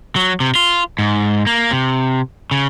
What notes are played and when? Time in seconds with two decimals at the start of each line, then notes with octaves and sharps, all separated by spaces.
0.16 F#3
0.40 C3
0.55 F4
0.99 G#2
1.47 A#3
1.71 C3
2.51 C#3